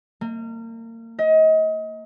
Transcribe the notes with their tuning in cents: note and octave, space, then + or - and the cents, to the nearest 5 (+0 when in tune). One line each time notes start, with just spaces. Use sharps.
A#3 -35
D#5 +30